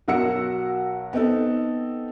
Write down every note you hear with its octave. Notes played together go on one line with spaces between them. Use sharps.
B1 F#4 A#4 F#5 E6 C#7
B3 C4 D#4 A4